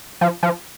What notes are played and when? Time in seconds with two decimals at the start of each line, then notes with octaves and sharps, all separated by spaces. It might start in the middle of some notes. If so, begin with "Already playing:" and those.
0.21 F3
0.43 F3